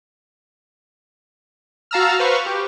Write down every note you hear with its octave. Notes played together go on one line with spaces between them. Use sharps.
F#4 F5 A5 A#5 E6 F6
B4 C5 F5 C#6
G4